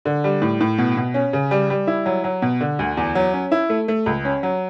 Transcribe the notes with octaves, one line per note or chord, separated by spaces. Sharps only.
D3
G3
A2
A2
B2
B2
C#4
C#3
G3
G3
E4
F#3
F#3
B2
D3
D2
E2
F#3
C#4
E4
A3
A3
C#2
C#4
F#3